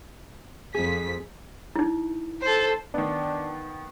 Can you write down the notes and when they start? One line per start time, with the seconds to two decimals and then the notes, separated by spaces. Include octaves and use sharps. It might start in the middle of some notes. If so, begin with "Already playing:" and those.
0.74 F2 G#4 B6
1.76 D#4 E4
2.41 A4 C5
2.94 D#3 B3 D4